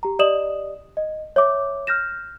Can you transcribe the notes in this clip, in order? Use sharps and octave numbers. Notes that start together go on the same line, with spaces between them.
G4 A#5
G4 D5 D#5 D#6 E7 F#7
D#5
C#5 E5 D6
F6 G6 A#6 E7